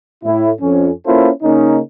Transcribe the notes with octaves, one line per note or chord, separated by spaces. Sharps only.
A2 E4
F2 C#4
A#3 C#4 E4 F4 A4 C5
C#3 A#3 C#4 D#4